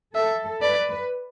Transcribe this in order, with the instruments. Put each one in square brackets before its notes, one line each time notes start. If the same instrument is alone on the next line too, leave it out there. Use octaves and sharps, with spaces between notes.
[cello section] A4 [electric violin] E5
[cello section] B4 [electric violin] D5